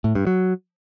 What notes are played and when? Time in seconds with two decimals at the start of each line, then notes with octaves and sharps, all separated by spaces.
0.04 A2
0.15 G2
0.27 F#3